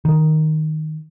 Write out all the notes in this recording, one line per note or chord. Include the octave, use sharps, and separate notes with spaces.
D#3